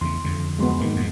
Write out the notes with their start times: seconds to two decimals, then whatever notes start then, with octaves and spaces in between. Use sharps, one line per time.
0.01 E2 C#3 C6
0.24 F2 D3
0.59 D2 F#3 G#3 B3 C6
0.81 G#2 D#3 A#3
0.96 F2 G#2